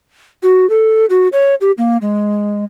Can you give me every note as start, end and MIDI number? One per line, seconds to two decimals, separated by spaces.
0.43 0.69 66
0.70 1.06 69
1.10 1.28 66
1.32 1.55 73
1.61 1.72 67
1.78 1.97 58
2.02 2.65 56